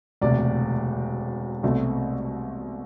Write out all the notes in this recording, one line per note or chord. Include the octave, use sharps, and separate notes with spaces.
E1 D2 C3 D5
C2 B2 A3 C4